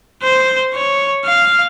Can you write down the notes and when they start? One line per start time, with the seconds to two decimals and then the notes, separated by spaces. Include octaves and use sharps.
0.23 C5
0.74 C#5
1.26 F5